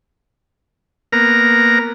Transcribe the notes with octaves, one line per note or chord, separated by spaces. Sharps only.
A#3 B3 A#4 A#5